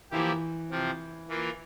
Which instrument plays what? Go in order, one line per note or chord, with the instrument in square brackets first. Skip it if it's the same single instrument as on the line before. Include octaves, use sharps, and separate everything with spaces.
[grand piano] E3 [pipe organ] F3 A#3 E4 G4
[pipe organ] C3 F3 C4 F4
E3 A#3 F4